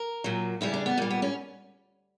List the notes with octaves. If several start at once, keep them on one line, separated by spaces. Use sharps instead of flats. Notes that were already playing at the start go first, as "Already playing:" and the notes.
Already playing: A#4
A#2 F#3
E2 C#3 G3 E4
D4
B3
A#2 G3 A#3
B3
C#4